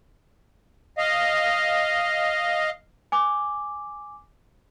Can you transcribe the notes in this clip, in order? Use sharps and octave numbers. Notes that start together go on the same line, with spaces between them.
D#5 F5
G#5 D6